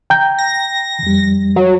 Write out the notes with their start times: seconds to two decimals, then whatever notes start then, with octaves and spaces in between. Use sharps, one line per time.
0.10 G5 A#5 G6
0.38 A#6
1.03 F2 G3
1.56 F#3